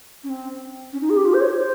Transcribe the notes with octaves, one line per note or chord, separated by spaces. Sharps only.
C#4
C4
C#4
D#4
G#4
G4
F4
C5
C#5
C5